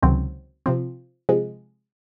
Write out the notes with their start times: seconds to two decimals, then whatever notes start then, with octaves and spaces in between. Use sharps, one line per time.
0.02 C#2 C3 D#3 F#3 C4
0.66 C3 F3 C4
1.29 C3 F3 G#3